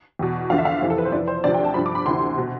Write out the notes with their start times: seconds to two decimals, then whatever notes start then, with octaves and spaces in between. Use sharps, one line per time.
0.19 E2 B2
0.50 E2 D3 F3 F5
0.58 E5
0.65 F5
0.82 F2 C3 E3
0.90 A4
0.98 B4
1.05 C5
1.12 F2 E3 D5
1.28 C5
1.44 D2 C3 F3 D5
1.54 G5
1.65 A5
1.74 G2 F3 B5
1.86 D6
1.95 B5
2.06 D2 C3 E3 C6
2.38 B2